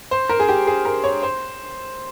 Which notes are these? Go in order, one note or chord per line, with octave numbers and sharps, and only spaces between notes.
C5
A#4
G#4
G4
G#4
A#4
C#5
C5